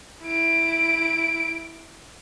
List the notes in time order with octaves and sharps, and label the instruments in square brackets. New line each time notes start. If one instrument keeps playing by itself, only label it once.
[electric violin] E4 D7